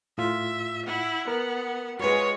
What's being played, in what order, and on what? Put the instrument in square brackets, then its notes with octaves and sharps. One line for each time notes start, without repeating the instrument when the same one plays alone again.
[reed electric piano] A2 F4 [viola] E5
[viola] E4 [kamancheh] F#5
[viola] B3 [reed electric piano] A#4
[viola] G#3 F4 [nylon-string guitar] F#4 B4 [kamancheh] C#5 G#5